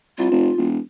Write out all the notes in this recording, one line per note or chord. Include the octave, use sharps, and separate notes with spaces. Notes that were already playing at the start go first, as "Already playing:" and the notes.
C2 F4
F1
E1